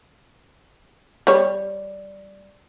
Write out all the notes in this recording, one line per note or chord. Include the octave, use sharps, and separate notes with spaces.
G3 C#5